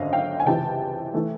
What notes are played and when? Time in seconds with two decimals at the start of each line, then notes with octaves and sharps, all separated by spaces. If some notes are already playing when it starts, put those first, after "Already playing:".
Already playing: G#1 F#2 D3 D#5 F5
0.13 F5 G5
0.40 G#5
0.46 C#2 C3 E3 G5 A5
1.14 E3 A3